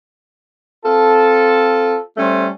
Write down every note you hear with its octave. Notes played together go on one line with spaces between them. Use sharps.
C4 F4 A4
G3 A3 C#4 C5